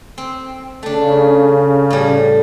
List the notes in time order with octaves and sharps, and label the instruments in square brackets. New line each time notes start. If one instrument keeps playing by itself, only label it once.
[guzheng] C4
[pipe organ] C#3 [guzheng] A3 D4
[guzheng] A2 G3